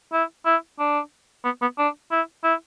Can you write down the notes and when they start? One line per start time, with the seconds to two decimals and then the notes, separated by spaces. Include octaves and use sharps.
0.13 E4
0.46 E4
0.80 D4
1.45 B3
1.62 B3
1.78 D4
2.11 E4
2.44 E4